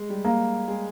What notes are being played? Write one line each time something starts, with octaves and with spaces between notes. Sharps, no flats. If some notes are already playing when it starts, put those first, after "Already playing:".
Already playing: G#3 G#4
G3 G4
A#3
G#3 G#4